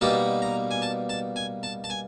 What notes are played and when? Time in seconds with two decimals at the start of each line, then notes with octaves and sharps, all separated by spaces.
0.01 B2 G3 A#3 D#4 A5
0.42 A#5
0.71 G#5
0.82 A5
1.09 A5
1.36 G#5
1.63 A5
1.84 A5
1.90 G#5